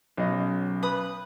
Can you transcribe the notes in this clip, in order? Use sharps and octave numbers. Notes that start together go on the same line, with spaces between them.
B1 B2 F#3 C#4 D#5
B4 B5 D#6